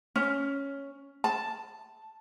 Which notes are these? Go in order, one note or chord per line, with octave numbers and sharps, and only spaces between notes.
C#4
A5